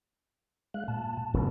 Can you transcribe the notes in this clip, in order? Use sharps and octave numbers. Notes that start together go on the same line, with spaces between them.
G#3 F5 F#6
A#2 A5
F1 B1 F2 C#3